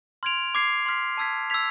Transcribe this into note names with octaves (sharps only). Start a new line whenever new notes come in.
C6 F6 G#6 D7 F7
D6 G#6 C7 F7
C6 F6 B6
A5 E6 G#6 B6
E6 G#6 B6 F7